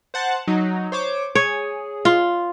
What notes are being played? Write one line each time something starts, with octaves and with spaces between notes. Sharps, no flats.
C5 F#5 A5
F#3 D#4
C5 C#5 D6
G#4 C#5
F4